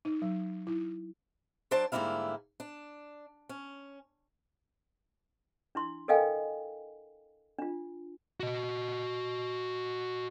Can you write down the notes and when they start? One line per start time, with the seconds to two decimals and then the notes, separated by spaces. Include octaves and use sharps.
0.05 D#4
0.22 F#3
0.67 E4
1.71 F#3 D4 C5 D5 A5
1.92 G#2 D3 G3 A#3 E4 F5
2.60 D4
3.49 C#4
5.75 D4 E4 C6
6.08 A4 A#4 D#5 F5 G5 G#5
7.59 D4 F4
8.40 F#4 D#5